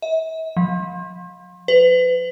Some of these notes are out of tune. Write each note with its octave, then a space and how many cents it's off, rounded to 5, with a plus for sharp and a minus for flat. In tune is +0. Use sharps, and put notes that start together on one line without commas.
E5 -40
F3 +35
B4 +35